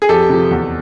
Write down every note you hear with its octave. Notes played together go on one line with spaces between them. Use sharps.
G#4
F2 G4 A4
C3 F3
E2